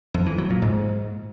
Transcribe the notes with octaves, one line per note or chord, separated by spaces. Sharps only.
F2
E3
F#3
A#2
G#2